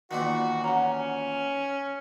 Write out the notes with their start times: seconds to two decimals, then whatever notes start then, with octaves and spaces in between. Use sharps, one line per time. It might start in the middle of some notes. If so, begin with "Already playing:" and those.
0.11 E2 A#2 D#3 F#4
0.64 C#4 F#5 A#5